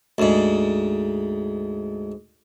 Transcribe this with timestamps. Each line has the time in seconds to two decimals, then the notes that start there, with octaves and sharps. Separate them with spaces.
0.18 D2 G#2